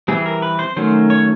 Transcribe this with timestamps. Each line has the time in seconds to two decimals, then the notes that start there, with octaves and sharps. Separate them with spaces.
0.08 E3 G3 C4 G#4
0.26 A#4
0.42 B4
0.59 C5
0.76 D#3 F#3 A3 C#4 C5
1.10 C#5